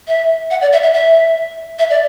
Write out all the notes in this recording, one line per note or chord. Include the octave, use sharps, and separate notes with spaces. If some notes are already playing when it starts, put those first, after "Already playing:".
E5
F#5
D5
E5
E5
E5
E5
D5